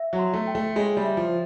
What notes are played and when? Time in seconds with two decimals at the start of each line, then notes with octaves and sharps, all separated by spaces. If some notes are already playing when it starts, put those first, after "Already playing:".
Already playing: E5
0.13 F#3
0.19 C6
0.34 A3
0.47 G5
0.55 A3
0.76 G#3 C#5
0.97 G3
1.04 E5
1.17 F3